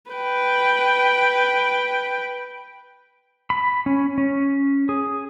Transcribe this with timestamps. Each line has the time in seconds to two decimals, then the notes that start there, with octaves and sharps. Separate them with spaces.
0.11 B4 G5
3.50 B5
3.86 C#4
4.18 C#4
4.89 G#4